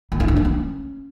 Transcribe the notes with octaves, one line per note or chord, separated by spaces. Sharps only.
A#3
E4
D4
A#3
C#4